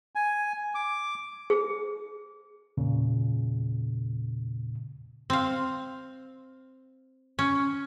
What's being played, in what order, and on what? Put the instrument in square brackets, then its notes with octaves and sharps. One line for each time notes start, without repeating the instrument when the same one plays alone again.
[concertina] G#5
D6
[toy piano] G#4
[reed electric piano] E2 A#2 C#3
[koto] C4 F5
C#4